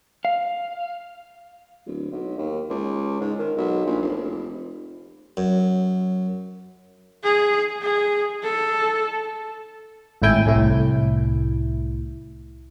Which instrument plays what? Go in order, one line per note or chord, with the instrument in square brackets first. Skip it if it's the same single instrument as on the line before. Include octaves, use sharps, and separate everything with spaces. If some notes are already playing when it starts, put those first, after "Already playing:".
[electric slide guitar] F5
[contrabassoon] D1
B1
D#2
C#2
G#2
D#3
B1
A#1
F1
[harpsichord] F#2
[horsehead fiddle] G#4
G#4
A4
[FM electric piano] G#1 A2 E4 G5 G#5
C2 A2 E4